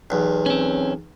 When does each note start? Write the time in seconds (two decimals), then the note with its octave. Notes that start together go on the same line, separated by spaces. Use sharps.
0.10 B1 E2
0.46 C4 C#4